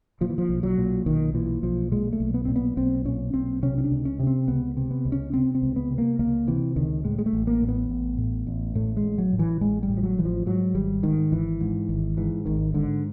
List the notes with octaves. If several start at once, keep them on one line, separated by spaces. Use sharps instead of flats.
A#2 F3
E3
F3
B1
F#3
A#2
B1 D#3
A#2 E3
B1 F3
A#2 G#3
A3
B1
B3
A#2 C4
B3
B1 C4
A#2 C#4
B1 C4
C3 C#4
C#4
D4
C#2
C#4
C3
C4
C#2 B3
C3
B3
C#2
C#4
C3 C4
C4
C#2
B3
C3
A#3
C#2 A#3
C3 E3
C#2 D#3
A2 G#3
G#3
A3
A1
A#3
A2
B3
A1
A2
A1
A2 A3
G#3
A1
F#3
A2
E3
A1 G#3
G3
A2
F3
F#3
A1 E3
F3
G#2 F#3
G#1 G3
G#2 D#3
G#1 E3
G#2
G#1
G#2 E3
G#1 D#3
G#2 D3